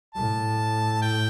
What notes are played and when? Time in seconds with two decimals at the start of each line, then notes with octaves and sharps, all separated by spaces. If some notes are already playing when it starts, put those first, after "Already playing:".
0.15 A2 A5
1.02 G5